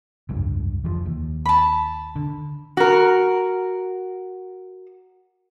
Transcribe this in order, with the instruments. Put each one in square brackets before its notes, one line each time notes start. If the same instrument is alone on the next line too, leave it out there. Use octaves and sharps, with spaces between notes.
[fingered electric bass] F1 C#2 G2
F1 E3 F3
D#2
[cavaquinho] A5 B5
[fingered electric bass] D3
[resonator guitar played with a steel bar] F#4 A#4